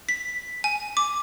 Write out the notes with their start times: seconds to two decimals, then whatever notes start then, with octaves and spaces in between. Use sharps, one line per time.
0.09 B6
0.64 G#5
0.97 D6